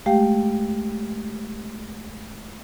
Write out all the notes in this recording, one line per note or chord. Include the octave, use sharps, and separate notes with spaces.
G#3 A3 G4 F5 G5